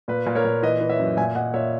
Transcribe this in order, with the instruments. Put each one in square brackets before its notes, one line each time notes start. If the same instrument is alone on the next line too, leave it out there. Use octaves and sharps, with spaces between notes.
[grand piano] A#2 B4
A#2
A#4 C#5
A#2
E3 B4 D#5
E3
C#5 E5
F#2
A#2 E5 G#5
A#2 D#5 F#5
A#2 C#5 E5